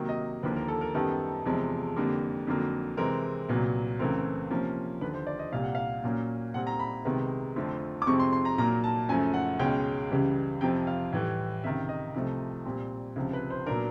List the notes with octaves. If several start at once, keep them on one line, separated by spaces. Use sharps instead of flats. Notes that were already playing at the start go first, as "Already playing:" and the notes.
Already playing: C3 D#3 F#3 A#3
D#5
D#2 D3 F3 A#3 B4
A#4
A4
A#4
F#2 D#3 G3 B3 A4
E2 C3 F3 G#3
F2 D3 G3 A#3
F2 D3 F#3 A#3
C3 E3 G#3 C4 A#4
C2 A#2 F#3 B3
C#2 C#3 E3 A3 C4 A#4
C3 F3 A#3 C#4
D#2 D3 F3 B4
C5
D5
D#5
C2 A#2 G3 F5
F#5
F5
A#2 F#3 A#3 C#4
A#2 G3 C4 F#5
A#5
B5
C2 C3 D#3 G#3 B3
F2 D3 F3 A3 C4
D6
F2 C3 F3 G#3 C4 C#6
C6
C6
A#5
A#2 F#3 A#3 A#5
A5
F#2 C#3 F3 A3 G#5
F#5
C#2 B2 G#3 C#4 G5
C#2 C#3 E3 G3
F2 C3 F3 G5
F5
A2 E3 G3
C#2 C3 D#3 E5
D#5
C2 C3 F3 A3
A#2 G3 C4
C#2 C3 F3
B4
C5
A#2 F#3 B3 D4 A#4